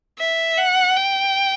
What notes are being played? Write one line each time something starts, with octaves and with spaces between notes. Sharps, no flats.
E5
F#5
G5